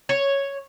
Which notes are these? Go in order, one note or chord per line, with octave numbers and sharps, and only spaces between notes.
C#5